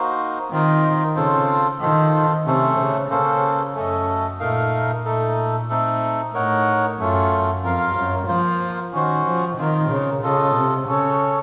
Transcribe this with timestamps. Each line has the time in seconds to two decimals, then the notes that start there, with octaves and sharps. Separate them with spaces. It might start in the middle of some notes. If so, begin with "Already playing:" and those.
Already playing: A#3 D#4 F#4 C5
0.51 D#3 C4 F4 A#4 D#5
1.16 C#3 C4 F4 A4 C5
1.80 D#3 F4 A4 C5
2.46 C3 A3 C#4 A4 C5
2.78 C#3
3.10 C#3 A#3 C#4 A4 C5
3.75 F#2 A3 C#4 A4 D#5
4.40 A#2 A3 D#4 A#4 F5
5.05 A#2 A3 D#4 A4
5.69 A3 C4 D#4 A4
6.34 A2 D#4 A#4 C#5 F#5
6.99 F#2 A3 C#4 F4
7.63 F2 F4 A#4 F5
7.96 F#2
8.28 F3 A#3 F4 C5
8.93 D#3 C#4 F#4 C5
9.26 F3
9.57 D#3 C4 F4 A#4
9.90 C#3
10.22 C#3 F4 A4 D#5
10.55 C3
10.87 C#3 C#4 A4 C#5